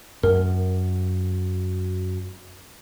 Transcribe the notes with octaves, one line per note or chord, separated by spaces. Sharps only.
F#2 A#4